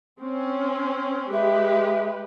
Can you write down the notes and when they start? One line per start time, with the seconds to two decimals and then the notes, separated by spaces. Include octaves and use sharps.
0.20 C4 C#4
1.33 G#3 G4 B4 E5